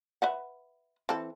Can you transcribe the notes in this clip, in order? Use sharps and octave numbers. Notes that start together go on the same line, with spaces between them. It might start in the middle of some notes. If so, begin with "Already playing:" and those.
B4 E5 F#5
E3 C4 A4